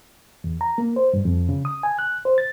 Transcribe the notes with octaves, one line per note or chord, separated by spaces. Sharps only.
E2
A#5
A#3
C5
G2
F2
C#3
D#6
G#5
F#6
C5
A6